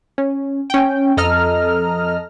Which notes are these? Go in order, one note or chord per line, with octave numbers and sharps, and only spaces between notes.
C#4
C#4 G5
F2 A4 D#5 A#5 F6